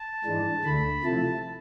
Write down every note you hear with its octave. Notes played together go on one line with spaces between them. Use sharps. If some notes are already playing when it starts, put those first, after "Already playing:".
Already playing: A5
G#2 E3 G#3 D4
D2 D3 A3 B5
C3 F3 A3 E4 A5